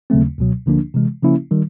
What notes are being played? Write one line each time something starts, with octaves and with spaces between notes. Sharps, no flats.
D#2 C#3 F#3 A3 C4
C#2 B2 F#3
D2 D3 F3 A#3 D4
C3 E3 G#3
C#3 F3 A#3 C#4 E4
D#3 G3